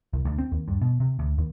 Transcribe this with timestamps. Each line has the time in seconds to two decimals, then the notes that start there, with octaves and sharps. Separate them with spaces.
0.13 C2
0.25 D2
0.38 C4
0.52 D#2
0.68 G2
0.81 B2
1.00 C3
1.19 D2
1.38 D#2